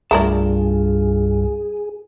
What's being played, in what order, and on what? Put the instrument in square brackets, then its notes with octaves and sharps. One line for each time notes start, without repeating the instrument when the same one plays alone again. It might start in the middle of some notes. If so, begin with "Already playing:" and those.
[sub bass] C2 [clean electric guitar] G2 F4 A5 [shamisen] A3 A#4 D5 [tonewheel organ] G#4